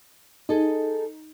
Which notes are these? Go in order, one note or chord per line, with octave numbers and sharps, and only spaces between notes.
D#4 G#4 A4 D#5